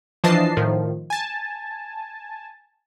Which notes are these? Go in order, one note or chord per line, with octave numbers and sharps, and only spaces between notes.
E3 F3 D4 D#5 A5 C7
A2 D#3 F3
G#5 A5